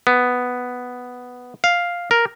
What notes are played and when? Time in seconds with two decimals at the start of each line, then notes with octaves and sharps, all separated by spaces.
0.07 B3
1.64 F5
2.11 A#4